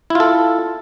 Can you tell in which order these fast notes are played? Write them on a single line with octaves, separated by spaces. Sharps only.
E4 F4 A4